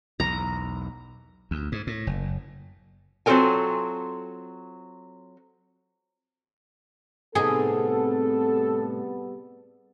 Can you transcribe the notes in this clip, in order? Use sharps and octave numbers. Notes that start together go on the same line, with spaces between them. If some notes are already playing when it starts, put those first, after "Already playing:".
B1 E2 A#5
D2
G#2
A2
F#1
F#3 C4 F4 A4 A#4 G#5
A2 C3 G3 B3 D#4 G#4 A4